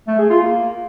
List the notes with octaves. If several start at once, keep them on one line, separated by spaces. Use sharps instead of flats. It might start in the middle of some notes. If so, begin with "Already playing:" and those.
A3
G#4
F4
A#3